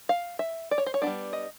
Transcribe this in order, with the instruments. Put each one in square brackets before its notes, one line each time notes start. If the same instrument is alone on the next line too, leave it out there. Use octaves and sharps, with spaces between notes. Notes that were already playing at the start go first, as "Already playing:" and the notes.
[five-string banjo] F5
E5
D5
C#5
C5
C#5
G3 B3 D4 D5
D#5